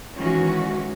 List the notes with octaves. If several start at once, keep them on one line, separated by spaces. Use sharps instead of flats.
D#3 E3 G#3 C#4 F#4